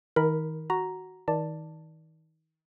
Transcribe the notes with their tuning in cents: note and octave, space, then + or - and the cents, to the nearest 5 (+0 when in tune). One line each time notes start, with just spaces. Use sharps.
D#3 +35 A#4 +0 B5 +0
F#4 +0 A#5 +0
D#3 +30 D5 +0 A5 +10